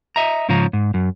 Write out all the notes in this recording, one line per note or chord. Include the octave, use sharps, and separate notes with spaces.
D#5 E5 A#5
G#2 C#3 F3 C#4 A#5
G#2
F#2